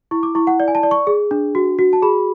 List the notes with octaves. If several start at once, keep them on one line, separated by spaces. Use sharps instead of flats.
E4 C#6
D6
E4 C#6
F#5
D5
G#5
A5
D5
C#6
G#4
D4
F#4
F#4
A5
G#4 B5